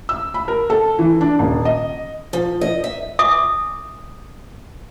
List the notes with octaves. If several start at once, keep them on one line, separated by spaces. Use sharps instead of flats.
E6
B5
A#4
A4
E3
D4
D#1
D#5
F3
D#5
E5
E5 G#5 D6 D#6